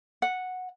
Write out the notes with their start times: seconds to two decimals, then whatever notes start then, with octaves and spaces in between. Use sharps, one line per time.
0.22 F#5